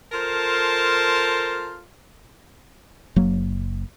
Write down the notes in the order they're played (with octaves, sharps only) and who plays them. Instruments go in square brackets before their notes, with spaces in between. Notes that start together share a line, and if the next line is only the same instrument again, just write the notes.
[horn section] F4 A4 A#4 C5 A5 C6
[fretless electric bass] F#1 F#3 A#3